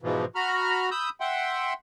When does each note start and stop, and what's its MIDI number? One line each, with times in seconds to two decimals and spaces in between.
0.02 0.25 44
0.02 0.25 47
0.02 0.25 52
0.02 0.25 53
0.35 0.89 66
0.35 0.89 82
0.35 0.89 83
0.35 0.89 89
0.91 1.09 83
0.91 1.09 87
0.91 1.09 88
0.91 1.09 91
1.20 1.73 76
1.20 1.73 78
1.20 1.73 79
1.20 1.73 84